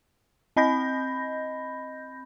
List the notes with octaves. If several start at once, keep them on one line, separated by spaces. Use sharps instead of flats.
C4 D#5 B5 G6 A#6